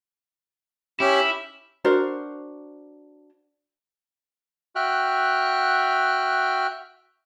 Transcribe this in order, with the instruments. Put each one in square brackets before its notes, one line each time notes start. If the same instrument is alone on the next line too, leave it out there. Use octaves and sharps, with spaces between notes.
[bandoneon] C#4 G4 [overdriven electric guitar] E4
[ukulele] D4 F#4 A#4 C5
[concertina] F#4 E5 G5 F6 F#6